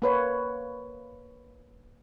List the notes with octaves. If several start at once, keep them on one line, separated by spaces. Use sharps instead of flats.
A#3 B4 C#5